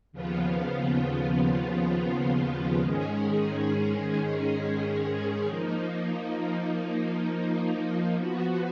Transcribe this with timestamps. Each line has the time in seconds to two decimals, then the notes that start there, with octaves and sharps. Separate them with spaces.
0.12 D#2 C#3 F3 B3 F4
2.79 G#2 D#3 G#3 C#4 G#4
5.46 F3 A#3 D#4
8.13 F3 B3 F#4